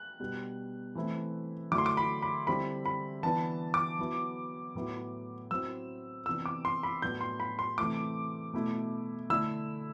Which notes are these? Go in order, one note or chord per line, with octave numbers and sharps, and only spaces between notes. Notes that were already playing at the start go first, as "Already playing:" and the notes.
Already playing: F#6
B2 G3 B3 D4
E3 A3 C4 E4
D3 F#3 A3 E4 D6
C6
D6
B5
B5
D3 G3 C4 E4 B5
B5
E3 B3 D4 A5
D6
F#3 B3 E4
A2 F#3 B3 E4
F#3 C4 E4 E6
C3 E3 B3 D4 E6
D6
C6
B5
A2 F#3 B3 D4 G6
C6
B5
C6
C3 E3 A3 D6
B2 A3 E4
D3 A3 E4 E6